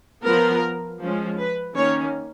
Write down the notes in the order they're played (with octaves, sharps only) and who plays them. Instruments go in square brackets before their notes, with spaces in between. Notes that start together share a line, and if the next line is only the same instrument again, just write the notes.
[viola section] F3 B3 A#4
F3 G#3 C#4
B4
D#3 A#3 C#4 C#5